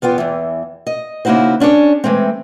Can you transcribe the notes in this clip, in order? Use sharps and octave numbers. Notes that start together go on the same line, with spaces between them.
E2 B3 F4 G5
E2 E3
D#5
C#3 A#3 D#4 E4 F#4 C5
C#4 D4 G#4 C#5
E3 G#3 A3 C4